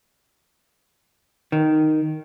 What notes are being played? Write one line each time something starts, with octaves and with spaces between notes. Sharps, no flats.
D#3